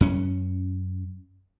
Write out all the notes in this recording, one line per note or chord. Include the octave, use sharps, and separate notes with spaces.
F#2 C#4